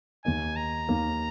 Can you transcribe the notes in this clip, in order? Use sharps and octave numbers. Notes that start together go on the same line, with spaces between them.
D#2 D#3 A#3 D#4 G#5
A#5
D#2 D#3 A#3 D#4